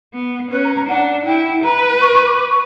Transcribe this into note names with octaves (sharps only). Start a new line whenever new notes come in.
B3
C#4 B4
A#5
A#5
D4 F#5
E4 G5
B4 A#5
C#6
C#6
D6
D6
C#6